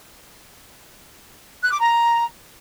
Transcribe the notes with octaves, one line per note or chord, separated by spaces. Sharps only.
F#6
D6
A#5